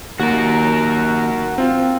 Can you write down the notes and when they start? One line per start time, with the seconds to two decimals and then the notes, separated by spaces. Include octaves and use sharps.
0.20 D#2 F#4 A#4
1.58 C4 F4